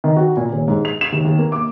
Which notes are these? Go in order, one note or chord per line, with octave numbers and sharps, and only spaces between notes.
D#3
F#4
A#2
D#1
G#2
F7
E7
D#2
D#2
A#3
D6